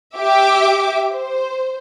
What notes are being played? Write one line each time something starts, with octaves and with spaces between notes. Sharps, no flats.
G4 E5 D6
C5